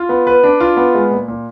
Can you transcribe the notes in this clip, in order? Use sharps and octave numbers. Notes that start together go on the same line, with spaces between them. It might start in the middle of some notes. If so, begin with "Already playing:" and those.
Already playing: F4
B3
B4
D4
F4
B3
G#3
A#2
A#2